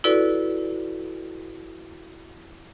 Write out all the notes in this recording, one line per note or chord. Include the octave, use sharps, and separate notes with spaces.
E4 F#4 A4 B4 D5